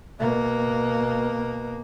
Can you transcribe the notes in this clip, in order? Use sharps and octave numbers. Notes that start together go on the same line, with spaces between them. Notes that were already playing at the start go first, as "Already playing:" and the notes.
B2 A#3